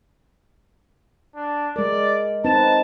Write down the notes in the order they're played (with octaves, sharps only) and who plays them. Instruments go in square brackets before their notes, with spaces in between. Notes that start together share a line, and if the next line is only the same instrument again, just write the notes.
[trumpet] D4
[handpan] G#3 A#4 [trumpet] D5
[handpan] C4 D#4 B4 [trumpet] A5